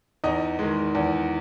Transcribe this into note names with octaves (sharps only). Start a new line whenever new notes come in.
E2 D#4 D#5
D#3 G#3
E2